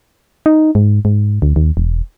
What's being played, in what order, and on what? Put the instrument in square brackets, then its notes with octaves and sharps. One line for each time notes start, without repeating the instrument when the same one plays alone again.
[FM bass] D#4
G#2
G#2
D2
D#2
E1